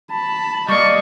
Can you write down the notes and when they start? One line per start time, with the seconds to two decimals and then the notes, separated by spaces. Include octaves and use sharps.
0.11 A5 B5
0.69 G3 A#3 D5 D#5 C#6